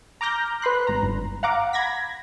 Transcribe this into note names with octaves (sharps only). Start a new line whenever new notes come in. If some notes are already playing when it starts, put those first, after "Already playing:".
A#5 D6 F6 G6 A#6
B4 B5 C6 F#6
G#1 A#5
G1
F5 F#5 A#5 D6
B5 G#6 A#6 B6